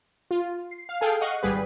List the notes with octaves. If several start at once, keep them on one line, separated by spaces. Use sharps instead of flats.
F4
C7
F5
G#4 A4 F5 G5
D#5 F5 F#5 C#6
G#1 G3 G#4 B4